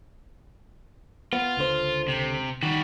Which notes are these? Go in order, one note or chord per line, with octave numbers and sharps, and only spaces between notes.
B3 F4
C#2 D3 C5
C3
D#3 G3 F#4